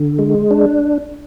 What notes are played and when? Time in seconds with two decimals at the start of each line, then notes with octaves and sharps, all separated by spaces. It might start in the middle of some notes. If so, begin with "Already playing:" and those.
Already playing: D3
0.19 G#3
0.51 D4